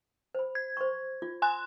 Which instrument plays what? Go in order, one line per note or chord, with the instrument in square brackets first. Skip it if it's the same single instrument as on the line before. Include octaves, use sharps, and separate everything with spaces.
[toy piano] C5 B5
[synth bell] G#6
[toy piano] C5 C6 C#6
F4
[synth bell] G#5 C6 F#6